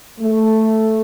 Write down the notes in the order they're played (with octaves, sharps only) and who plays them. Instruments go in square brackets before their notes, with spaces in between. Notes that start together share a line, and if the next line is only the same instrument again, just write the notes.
[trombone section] A3